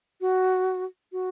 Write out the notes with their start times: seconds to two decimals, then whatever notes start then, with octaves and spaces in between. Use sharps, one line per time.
0.21 F#4
1.12 F#4